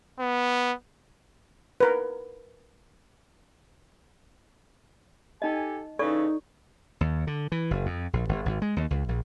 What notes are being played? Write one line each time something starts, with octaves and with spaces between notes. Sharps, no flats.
B3
A#4 B4
D#4 G4 A4 D#5 G#5
C#3 E3 A3 D#4 A4 D5 C#6
D#2
D3
E3
F#1
F2
A#1
G1
G#1
G#3
D#2
C#2
A#1